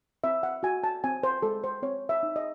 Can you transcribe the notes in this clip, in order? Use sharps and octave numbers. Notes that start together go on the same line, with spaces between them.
C4 E5
F#5
F#4 G#5
A5
C4 G#5
C5
G#3 A4
C5
C4 C#5
E5
D#4
D#5